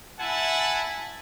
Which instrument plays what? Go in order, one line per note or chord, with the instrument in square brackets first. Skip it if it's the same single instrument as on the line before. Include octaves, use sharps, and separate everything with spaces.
[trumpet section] E4 E5 F#5 G#5 A5